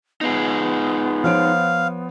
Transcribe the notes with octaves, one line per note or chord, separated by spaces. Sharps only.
B3 D#4 F4 G#4
F3 C#5 F5 D7